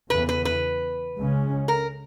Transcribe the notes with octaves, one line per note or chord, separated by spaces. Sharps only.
E2 C#3 E3 B3 B4
B4
B4
C#2 C#3 G#3 C#4
A#4